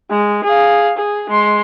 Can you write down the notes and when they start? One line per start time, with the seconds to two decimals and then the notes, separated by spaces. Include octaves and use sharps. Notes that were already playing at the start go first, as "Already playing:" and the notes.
0.10 G#3
0.44 G#4 F5
0.97 G#4
1.29 G#3 C6